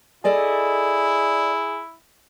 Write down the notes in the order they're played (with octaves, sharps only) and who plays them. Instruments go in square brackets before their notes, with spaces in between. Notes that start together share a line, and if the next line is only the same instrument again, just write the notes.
[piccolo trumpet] E4 [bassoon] G#4 [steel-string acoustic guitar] A4 D5 D#5